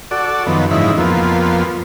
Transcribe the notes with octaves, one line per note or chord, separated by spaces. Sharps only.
F#4 A4 D5
F#2 D#3 F3 B3
G#2 C#3 E3 F3 D#4 E4
F2 F3 A#3 B3